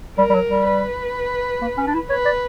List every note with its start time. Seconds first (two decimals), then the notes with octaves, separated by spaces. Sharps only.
0.18 G3 A#4
0.30 G3
0.34 F#3
0.50 G3
0.67 B4
1.62 A#3
1.78 C#4
1.87 D4
1.94 E4
2.10 B4 C#5
2.25 D5